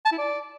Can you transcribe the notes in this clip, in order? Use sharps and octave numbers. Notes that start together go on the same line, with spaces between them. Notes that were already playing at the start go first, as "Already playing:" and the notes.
A5
E4
D5